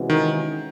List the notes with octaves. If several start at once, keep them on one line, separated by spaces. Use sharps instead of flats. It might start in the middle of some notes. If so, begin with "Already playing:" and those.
Already playing: C3 E3 G#3 C#4 F#4
D#3